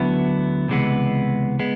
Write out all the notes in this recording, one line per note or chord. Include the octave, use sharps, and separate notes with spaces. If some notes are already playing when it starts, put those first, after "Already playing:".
Already playing: D2 D3 F#3 B3 E4
C#2 C3 E3 G#3 B3
G#3 B3